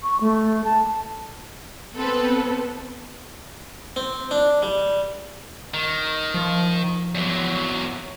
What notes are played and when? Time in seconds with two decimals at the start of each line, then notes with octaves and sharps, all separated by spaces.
0.03 C#6
0.21 A3
0.65 A5
1.96 B3 C4 A4 B4
3.96 C4
4.31 D4
4.62 G3
5.74 D#3
6.34 F3
7.15 E2 F#3